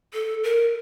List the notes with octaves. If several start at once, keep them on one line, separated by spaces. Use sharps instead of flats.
A4
A#4